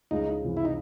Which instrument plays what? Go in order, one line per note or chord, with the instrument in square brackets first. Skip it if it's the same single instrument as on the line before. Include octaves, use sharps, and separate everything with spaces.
[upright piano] C#2 [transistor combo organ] D#4
[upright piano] C3 E3
[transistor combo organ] E4
D#4